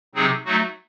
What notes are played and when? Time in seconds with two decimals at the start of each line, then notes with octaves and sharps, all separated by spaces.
0.15 C3 F#3 C4 D#4 G#4
0.45 F#3 A3 D#4 F#4